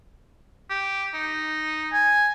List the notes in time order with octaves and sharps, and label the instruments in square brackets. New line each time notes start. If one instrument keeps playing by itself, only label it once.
[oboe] G4
D#4
[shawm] G#5